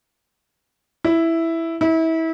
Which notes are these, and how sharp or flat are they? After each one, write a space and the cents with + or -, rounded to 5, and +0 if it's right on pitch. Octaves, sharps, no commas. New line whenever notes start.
E4 +0
E4 -30